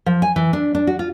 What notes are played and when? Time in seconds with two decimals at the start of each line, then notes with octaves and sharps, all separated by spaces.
0.06 F3
0.22 G#5
0.36 E3
0.53 D4
0.75 D4
0.87 F#4
0.99 F4